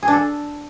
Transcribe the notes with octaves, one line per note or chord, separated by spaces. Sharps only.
G#4
D4
A4